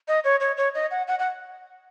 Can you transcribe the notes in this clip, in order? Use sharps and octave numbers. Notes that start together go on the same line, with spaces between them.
D#5
C#5
C#5
C#5
D#5
F#5
F#5
F#5